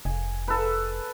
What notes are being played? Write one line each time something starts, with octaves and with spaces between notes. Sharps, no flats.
F1 G#5
A4 B4